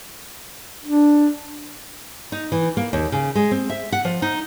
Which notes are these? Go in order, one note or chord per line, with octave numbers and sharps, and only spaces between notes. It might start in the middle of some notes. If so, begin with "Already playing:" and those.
D4
D#4
E3
A#3
D#2
C#3
G#3
C4
E5
F#5
F3
D#4